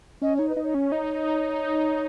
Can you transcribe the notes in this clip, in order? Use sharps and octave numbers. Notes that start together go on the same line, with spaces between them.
C#4 D#5
D#4 C#5
B4
D#4
C#5
C#4
D#4